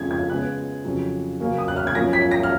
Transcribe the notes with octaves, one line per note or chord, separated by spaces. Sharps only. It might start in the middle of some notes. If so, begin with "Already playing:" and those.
Already playing: F2 C#3 F3 G#3 G#6
G#6
C#3 G#3 B3 F#6
F2 C#3 F#3
C#3 F#3 A#3 C#4
D#6
F#6
F6
G#6
F#2 F3 A#3 C#4 A#6
B6
A#6
F6